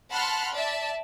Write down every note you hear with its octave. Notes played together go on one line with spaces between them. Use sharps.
F#5 A5 B5 C6 F6 F#6
D5 E5 A5